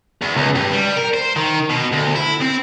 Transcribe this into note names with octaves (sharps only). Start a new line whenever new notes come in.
E2
C#2
G2
G3
A#4
C5
D#3
B2
D2
E4
C4